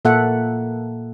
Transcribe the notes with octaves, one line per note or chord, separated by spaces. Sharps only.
A#2 A#3 A4 E5 F#5